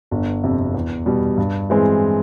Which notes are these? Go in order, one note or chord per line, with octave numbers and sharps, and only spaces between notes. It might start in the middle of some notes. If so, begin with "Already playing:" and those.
G1
F2 C3
E2
B2 G3
G2
E3 G#3 C4